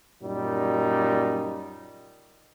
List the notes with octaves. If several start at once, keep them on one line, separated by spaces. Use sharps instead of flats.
F#2 A#2 G3 D#4